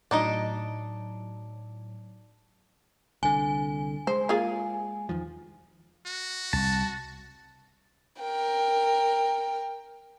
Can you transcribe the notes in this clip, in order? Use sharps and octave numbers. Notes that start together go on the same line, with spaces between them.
A2 F#3 D4 D#4 D#5
C2 D3 G#5
G#3 C5
A#3 F4 G#4
E2 D#3 F3
F#4
C2 A5
A#4 G5